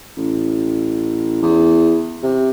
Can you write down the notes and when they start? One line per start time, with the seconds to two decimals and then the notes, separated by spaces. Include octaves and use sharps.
0.17 A1
1.42 E2
2.23 C3